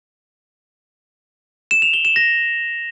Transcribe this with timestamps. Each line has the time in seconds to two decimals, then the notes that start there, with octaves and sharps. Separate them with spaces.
1.71 E7
1.82 F7
1.93 G7
2.05 E7
2.16 A#6